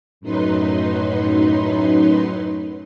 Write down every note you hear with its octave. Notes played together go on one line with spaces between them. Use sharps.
F#2 A2 F#3 D#4 B4 C6